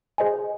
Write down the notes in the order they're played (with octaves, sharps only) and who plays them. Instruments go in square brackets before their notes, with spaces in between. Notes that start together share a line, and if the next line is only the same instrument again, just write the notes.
[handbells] G#4 C5 D#5 G#5